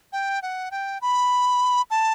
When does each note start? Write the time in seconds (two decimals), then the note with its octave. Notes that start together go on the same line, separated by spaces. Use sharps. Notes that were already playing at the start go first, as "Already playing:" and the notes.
0.13 G5
0.42 F#5
0.71 G5
1.02 B5
1.90 A5